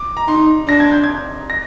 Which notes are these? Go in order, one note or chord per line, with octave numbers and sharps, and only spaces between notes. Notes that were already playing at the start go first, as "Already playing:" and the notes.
Already playing: D6
A#5
D#4 C6
D4 A#6
G#6
G6
G#6
A#6